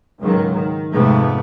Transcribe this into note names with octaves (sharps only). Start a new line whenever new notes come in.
C#2 G#2 D#3 F#3
D#3
F2 G#2 C3 A3 B3